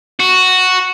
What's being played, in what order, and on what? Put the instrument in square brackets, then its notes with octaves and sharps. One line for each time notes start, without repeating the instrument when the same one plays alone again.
[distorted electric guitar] F#4